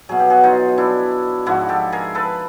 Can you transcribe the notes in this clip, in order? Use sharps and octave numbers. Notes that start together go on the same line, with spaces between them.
B2 F#3 G#4
G4
F#4 G#4
D#4 F4
D4 E4
G#2 F3 E4 F#4
G4 A4
G#4 A#4
A4 B4